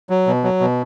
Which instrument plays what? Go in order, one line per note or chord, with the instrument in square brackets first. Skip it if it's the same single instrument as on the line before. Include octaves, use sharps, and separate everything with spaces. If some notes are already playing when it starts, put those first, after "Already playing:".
[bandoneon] F#3
B2
F#3
B2